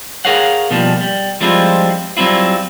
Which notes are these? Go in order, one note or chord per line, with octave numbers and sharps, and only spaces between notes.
G#4 A#4 C#5 F5 F#5
B2 F3 G3 A#3
G3
F3 G3 G#3 C4 E4 F4
F#3 G3 C4 E4 F4